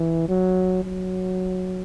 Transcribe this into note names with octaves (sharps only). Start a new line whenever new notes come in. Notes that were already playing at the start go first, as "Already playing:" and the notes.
Already playing: E3
F#3
F#3